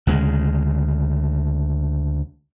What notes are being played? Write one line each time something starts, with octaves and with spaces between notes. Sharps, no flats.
D2 C#3 G#3